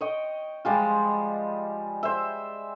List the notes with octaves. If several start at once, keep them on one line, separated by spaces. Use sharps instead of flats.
C#5 D#5 G5
F3 G3 G#3 F4
C5 E5